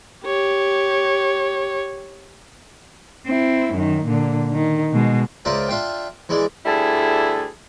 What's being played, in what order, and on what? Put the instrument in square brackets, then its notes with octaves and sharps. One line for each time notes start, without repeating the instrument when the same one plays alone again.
[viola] G4 C#5
[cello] C4 E4
F#2 D#3
A#2 D3
D#3
B2 G#3
[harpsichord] C#2 F4 A#4 C5 D5 E5
D4 F4 E5 F5 G5
E3 G#3 E4 D5
[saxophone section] D2 G3 E4 G#4 A4